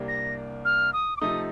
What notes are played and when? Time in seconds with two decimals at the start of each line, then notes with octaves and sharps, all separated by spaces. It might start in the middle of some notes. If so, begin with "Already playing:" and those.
Already playing: C2 C3 G3 A#3 D4
0.08 A#6
0.65 F6
0.93 D#6
1.17 D6
1.21 C3 F3 A3 D#4 D#6